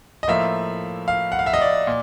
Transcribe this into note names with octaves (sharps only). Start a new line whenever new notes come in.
D#5
A2 F3 A#3 E5
F5
F#5
F5
E5
D#5
D5
A#2